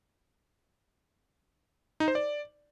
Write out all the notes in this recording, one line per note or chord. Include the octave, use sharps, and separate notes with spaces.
D#4
C5
D5